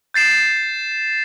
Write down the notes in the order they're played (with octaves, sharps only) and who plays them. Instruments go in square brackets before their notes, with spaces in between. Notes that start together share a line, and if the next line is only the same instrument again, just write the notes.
[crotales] G6 A6 C7 E7